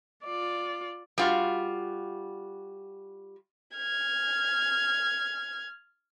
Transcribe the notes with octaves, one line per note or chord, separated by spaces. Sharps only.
F4 D5
G3 F4 F#4
F6 G#6